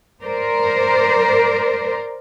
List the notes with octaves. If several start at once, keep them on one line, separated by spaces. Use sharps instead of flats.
A#4 C5 D5